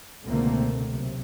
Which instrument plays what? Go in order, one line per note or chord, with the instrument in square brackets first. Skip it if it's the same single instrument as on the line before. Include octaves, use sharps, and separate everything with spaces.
[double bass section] C#2 B2 D3 A3 A#3 C4
B1 C3